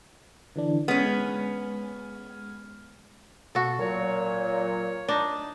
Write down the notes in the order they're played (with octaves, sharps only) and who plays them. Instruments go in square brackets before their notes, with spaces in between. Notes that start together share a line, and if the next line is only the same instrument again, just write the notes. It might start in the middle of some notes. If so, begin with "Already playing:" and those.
[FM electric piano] D3 E3 D4
[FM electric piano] G#3 F6 [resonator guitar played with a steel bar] B3 C#4
[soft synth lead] B2 [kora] F#4 A4
[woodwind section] A#2 F#3 [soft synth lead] A#4 [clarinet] C#5
[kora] D4 D#4